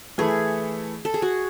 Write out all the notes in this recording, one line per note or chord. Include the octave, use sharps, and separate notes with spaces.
E3 A3 E4 G#4 A4
A4
G#4
F#4